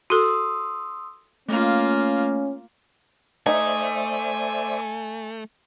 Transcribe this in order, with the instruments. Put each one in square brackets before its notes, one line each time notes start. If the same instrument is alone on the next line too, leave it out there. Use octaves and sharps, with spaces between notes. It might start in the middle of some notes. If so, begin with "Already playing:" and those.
[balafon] F#4 A4 [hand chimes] C6 D#6 E6
[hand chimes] A3 [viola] A#3 F4 [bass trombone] C#4
[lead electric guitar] A3 [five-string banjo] D#4 [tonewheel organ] C5 D5 E5 [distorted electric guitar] G#5